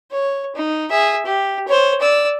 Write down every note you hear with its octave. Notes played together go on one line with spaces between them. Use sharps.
C#5
D#4
G#4 E5
G4
C5 C#5
D5 E6